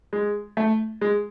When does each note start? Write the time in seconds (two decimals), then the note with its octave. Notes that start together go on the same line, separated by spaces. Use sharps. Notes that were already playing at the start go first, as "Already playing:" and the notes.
0.13 G#3
0.57 A3
1.01 G#3